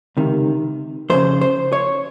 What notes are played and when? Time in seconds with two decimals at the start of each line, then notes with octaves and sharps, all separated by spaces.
0.17 C#2 C3 D#3
1.10 F2 C#3 C5
1.41 C5
1.73 C#5